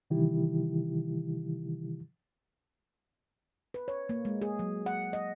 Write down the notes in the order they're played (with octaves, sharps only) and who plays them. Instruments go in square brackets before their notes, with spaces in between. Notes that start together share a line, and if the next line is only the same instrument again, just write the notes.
[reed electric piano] C3 D#3 E3 G3 E4 G4
[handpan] B4
C#5
A#3
G#3
G#4
F#3
F#5
D#5